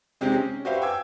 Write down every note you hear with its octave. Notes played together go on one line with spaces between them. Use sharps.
C3 G#3 C4 D#4 G4 G#4
C#4
F#4 G4 B4 C5 E5 F5
G5 G#5 D6 E6 G#6